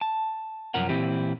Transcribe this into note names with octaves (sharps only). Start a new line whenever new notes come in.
A5
C2 F#2 F3 C#4 A#4 F#5
A#2 E3 C4 E4 G4